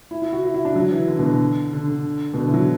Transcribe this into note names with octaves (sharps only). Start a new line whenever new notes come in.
E4
E4
F#4
E4
E4
D4
F#3
E3
D3
B2
D3
D3
D3
B2
D3
E3
F#3